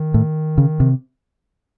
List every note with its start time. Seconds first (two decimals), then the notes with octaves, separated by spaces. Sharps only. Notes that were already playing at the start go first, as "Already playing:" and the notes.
Already playing: D#3
0.14 A2
0.58 C#3
0.80 C3